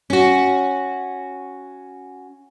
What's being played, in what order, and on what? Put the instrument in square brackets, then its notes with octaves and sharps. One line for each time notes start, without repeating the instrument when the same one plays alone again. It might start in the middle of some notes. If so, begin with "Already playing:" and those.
[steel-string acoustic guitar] C#4 F#4